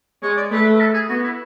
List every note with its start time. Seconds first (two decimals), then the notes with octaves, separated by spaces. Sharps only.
0.22 G#3 C#5
0.37 D5
0.51 A3 B4
0.74 B4
0.80 A4
0.94 G#4
1.09 B3 F#4
1.24 E4